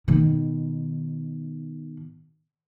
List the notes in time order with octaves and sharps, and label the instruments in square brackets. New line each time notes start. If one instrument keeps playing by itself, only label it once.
[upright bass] B2 D#3